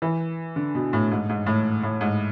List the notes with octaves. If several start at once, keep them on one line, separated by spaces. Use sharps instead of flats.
E3
D3
B2
A2
G#2
G#2
A2
A2
G#2